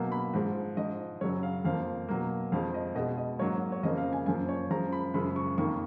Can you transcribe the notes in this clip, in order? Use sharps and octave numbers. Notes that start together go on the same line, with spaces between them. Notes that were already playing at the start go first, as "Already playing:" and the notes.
Already playing: B2 F#3 A#3
B5
G#2 F3 G#3
G#2 F3 G#3 D#5
F#2 C#3 F#3 C#5
F5
F2 F3 A#3 F5
B2 F#3 A#3
F2 F3 G#3 F5
D#5
B2 G#3 D#5
D#5
G#2 F#3 A#3 C#5
C#5
F2 C#3 F3 A#3 D#5
F5
G#5
F#2 F3 A#3 G#5
C#5
F#2 F3 G#3 A#5
B5
F#2 C#3 F3 G#3 B5
C#6
F2 D#3 A#3 C#6